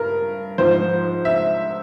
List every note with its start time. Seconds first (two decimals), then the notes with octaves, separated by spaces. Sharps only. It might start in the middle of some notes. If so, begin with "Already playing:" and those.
Already playing: G2 A#4
0.58 G#2 F3 C5
1.25 E5